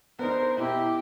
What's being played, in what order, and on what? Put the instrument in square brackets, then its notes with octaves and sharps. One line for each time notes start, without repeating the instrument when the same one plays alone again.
[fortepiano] B3 D4 D#4 [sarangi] A#4 [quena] C5
[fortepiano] B2 [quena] E4 [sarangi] G4